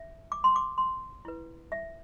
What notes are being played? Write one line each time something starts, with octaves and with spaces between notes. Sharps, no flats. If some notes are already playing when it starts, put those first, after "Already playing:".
Already playing: E5
D6
C6
D6
C6
E4 B4
E5